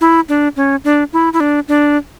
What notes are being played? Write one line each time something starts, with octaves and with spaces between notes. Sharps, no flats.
E4
D4
C#4
D4
E4
E4
D4
D4